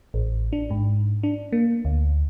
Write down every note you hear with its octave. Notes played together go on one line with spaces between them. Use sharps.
A1
D4
G#2
D4
A#3
D2